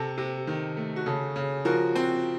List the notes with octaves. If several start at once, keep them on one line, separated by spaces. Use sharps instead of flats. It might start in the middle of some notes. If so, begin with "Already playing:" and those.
Already playing: C3 A4
C3
D#3
A3
F#4
C#3 A4
C#3
F3 F#4 A#4
C4